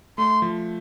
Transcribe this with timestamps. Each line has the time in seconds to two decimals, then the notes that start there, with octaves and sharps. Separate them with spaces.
0.18 A3 C6
0.42 F3